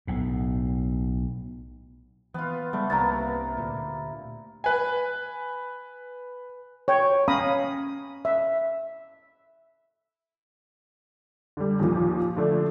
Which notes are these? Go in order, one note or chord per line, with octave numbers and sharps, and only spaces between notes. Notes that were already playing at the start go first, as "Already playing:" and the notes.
B1 A2
E3 B3 F4
C#3 G3 A3 B3
C2 G2 C3 A#3 E4 A#5 A6
D2 A#2
B4 G#5
C#5 G5
C#4 F5 A#5 B5 D#6
E5
D3 G3
D#2 A#2 F3
D3 F3 A3 D4